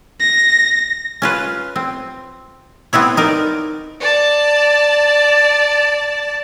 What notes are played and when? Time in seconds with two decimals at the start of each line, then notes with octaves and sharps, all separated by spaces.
0.20 A#6
1.22 C#4 F4 B4
1.76 C4
2.93 B3 C4 E4 C#5
3.17 D#4 A#4 D5
4.00 D5 A5